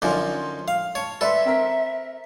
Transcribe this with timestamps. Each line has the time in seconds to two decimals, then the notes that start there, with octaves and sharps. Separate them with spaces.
0.02 F#2 D3 F3 D#4 G#5 C6
0.68 F5
0.95 C#5 A5
1.21 A4 B4 D5 E5 C6
1.45 C4 A#4 B6